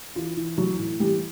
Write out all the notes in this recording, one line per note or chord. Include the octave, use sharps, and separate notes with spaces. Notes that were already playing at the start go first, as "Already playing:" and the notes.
E3 F4
E3
E3 F#3 F#4
A2
E3 G3 G4